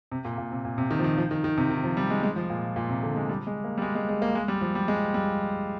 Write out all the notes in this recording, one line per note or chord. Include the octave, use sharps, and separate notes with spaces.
C3
A#2
A#2
C3
A#2
C3
D#3
F3
D#3
F3
D#3
D#3
C3
D#3
F3
G3
G#3
G#3
F3
A#2
A#2
C3
D3
G#3
G3
G#3
A#3
G3
G#3
G#3
G#3
A#3
G#3
G3
F3
G3
G#3
G3